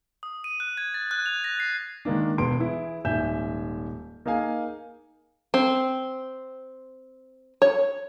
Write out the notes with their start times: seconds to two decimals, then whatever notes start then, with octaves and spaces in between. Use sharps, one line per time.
0.23 D#6
0.44 D#7
0.60 F#6
0.77 G#6
0.94 A6
1.11 F#6
1.26 F7
1.44 A#6
1.60 C7
2.05 D#3 G#3 A#3 D4
2.38 E1 B3 C6 D7
2.59 E3 E4 G#4
3.05 D#1 G#2 E5 G#5 G6 E7
4.26 A#3 D#4 G#4 F5 G#5
5.54 C4
7.62 C#5